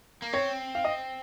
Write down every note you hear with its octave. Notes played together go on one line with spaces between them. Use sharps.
A#3
C4 C#5
F5
D#5